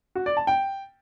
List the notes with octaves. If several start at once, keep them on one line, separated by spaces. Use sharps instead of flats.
F#4
D5
A5
G5